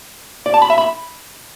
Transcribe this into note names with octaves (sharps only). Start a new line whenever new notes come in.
D5
A5
B5
E5
B5